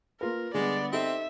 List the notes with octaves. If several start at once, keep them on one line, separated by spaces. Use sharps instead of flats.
A#3 F4 A#4 B4
D3 G3 G#3 B3 D5
C4 D#4 G4 A4 E5